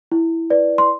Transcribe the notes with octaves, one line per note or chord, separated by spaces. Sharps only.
E4
B4 D5
C6